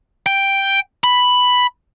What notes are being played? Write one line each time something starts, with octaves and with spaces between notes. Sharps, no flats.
G5
B5